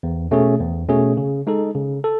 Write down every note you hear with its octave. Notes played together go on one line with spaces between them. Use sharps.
E2
B2 A3 C#4 G#4
E2
B2 A3 C#4 G#4
C#3
G#3 D#4 A4
C#3
A4